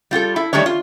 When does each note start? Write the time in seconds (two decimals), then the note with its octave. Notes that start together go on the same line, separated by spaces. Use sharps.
0.11 G3 F4 F#4 A4
0.36 E4
0.53 D#3 G3 A3 D4 C#5
0.66 F4